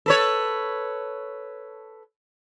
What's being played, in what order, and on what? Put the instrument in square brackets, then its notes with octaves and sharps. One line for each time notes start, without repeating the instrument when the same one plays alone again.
[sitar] A4 B4 C#5